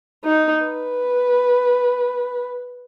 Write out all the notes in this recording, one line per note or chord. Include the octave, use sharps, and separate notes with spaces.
D#4
B4